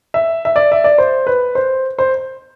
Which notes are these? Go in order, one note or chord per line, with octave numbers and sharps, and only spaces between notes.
E5
E5
D5
E5
D5
C5
B4
C5
C5